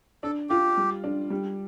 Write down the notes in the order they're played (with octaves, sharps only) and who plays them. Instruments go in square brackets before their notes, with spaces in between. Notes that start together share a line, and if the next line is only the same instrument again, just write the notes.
[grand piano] D4 [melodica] A4
[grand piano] F4 [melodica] G4
[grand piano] G3
D4
G3